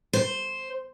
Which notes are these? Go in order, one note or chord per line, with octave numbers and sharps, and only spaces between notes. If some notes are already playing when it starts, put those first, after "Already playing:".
C5